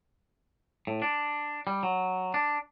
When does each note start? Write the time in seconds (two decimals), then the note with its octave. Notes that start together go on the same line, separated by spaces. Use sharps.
0.87 A2
1.02 D4
1.67 G3
1.83 F#3
2.34 D4